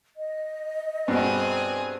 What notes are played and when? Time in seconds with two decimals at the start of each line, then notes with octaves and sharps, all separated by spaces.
0.16 D#5
1.08 G2 B2 C4 G#4